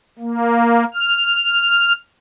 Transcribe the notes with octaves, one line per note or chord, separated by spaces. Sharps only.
A#3
F6